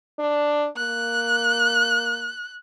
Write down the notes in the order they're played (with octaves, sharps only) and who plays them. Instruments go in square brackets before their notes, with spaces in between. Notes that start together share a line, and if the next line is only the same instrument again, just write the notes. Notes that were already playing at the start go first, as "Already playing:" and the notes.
[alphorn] D4
[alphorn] A#3 [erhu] F#6